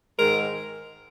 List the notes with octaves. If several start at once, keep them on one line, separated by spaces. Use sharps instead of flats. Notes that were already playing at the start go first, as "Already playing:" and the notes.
G#2 D#3 G#3 A#4